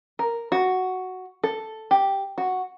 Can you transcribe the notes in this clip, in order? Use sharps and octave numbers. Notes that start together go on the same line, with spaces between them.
A#4
F#4
A4
G4
F#4